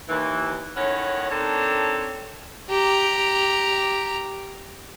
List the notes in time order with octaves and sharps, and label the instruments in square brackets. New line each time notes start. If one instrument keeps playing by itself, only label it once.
[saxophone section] D#2 E3
A2 D#3 C#4 C#5 F#5
D#3 C4 D4 A4 C#5
[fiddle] G4 A#5